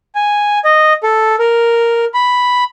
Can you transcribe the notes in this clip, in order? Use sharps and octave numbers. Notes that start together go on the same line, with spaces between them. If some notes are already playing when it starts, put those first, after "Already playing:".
G#5
D#5
A4
A#4
B5